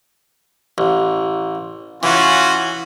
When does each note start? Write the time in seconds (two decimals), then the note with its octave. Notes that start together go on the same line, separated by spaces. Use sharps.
0.78 A1
2.03 E3 C#4 F4 F#4